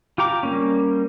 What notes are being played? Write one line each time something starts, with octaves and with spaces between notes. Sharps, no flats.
F4 G4 G5 A#5 D6
G3 A#3 C#4